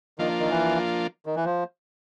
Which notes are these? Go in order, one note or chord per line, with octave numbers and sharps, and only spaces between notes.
D#3 F3 A#3 D4 F4
D#3
E3
D#3
E3
F3